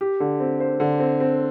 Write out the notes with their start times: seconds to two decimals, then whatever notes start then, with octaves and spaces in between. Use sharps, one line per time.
0.01 G4
0.20 D3
0.40 C4
0.60 C5
0.80 D3
1.00 C4
1.20 C4